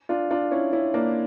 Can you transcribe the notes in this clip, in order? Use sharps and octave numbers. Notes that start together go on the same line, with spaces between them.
D4 F4
D4 F4
C#4 E4
C#4 E4
A#3 D4